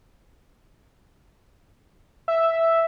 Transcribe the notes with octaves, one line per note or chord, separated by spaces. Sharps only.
E5